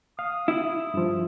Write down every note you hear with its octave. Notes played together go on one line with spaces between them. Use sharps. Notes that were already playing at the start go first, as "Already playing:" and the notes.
F5 D#6
E4
G2 F3